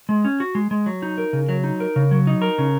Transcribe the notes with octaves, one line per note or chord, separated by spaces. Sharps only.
G#3
C#4
F#4
G#3
G#3
F#3
D#4
A#4
C#3
F#3
D#4
A#4
C#3
F#3
D#4
A#4
C#3